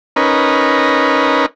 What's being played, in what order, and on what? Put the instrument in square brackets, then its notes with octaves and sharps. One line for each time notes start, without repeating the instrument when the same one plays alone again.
[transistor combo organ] C#4 D#4 A#4 B4